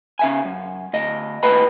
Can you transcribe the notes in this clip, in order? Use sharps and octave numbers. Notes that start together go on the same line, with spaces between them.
C#3 E5 G#5
F#2
D2 D#5
D#2 A2 B4 D#5 G5 B5